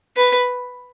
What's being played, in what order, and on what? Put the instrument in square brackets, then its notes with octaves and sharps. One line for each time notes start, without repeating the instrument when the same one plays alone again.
[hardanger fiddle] B4